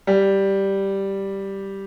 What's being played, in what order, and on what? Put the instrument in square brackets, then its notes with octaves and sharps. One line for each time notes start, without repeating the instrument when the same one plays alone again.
[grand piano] G3